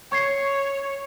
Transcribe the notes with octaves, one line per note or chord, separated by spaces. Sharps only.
C#5 C#6 G#6 C7